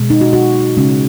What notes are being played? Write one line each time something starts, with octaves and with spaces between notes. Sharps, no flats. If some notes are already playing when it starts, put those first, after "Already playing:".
Already playing: B2 G#3
D#4
F#4
F#4
C#3 G#3 C#4